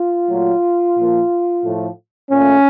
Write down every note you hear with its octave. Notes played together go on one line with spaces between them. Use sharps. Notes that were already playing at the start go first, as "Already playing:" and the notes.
Already playing: F4
A#2 F#3 A3
A#2 F3 A#3
A2 F3 A3
A#2 A3 C#4